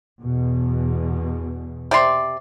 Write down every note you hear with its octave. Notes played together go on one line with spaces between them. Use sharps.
E2 B2
C3 D5 C6